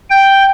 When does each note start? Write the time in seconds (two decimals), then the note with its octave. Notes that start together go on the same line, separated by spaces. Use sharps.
0.10 G5